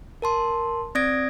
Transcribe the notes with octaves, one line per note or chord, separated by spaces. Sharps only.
A#4 A5 C6
C4 D5 D#6 G#6 A#6 D7